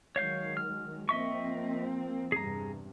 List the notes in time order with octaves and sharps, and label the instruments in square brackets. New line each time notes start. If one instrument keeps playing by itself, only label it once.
[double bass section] D#3 F#3 G#3 [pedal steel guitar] C#5 F5 G6
[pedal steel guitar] F6
[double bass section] F3 A#3 C4 [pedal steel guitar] D#5 E5 C#6
[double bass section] E2 G2 C3 [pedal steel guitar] G#4 A#5